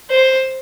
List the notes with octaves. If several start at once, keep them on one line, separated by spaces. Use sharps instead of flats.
C5